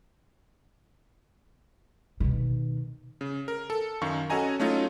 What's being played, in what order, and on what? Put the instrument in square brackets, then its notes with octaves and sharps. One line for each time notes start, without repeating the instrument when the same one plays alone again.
[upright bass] B2 D#3
[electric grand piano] C#3
A#4
A4
F#2 D#3 F5 C#6
C#4 F#4 A4 D#5 G#5 A#5
F#3 A3 C#4 D#4 F4